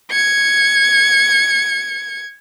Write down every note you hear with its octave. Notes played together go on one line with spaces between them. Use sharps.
G#6 C#7